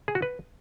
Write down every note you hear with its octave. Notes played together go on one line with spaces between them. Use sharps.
G#4
F#4
B4